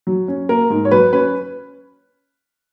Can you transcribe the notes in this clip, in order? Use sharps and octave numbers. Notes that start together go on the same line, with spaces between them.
F#3
C#4
A#3 A#4
G#2
C#5
F#3 B4
C#4 B4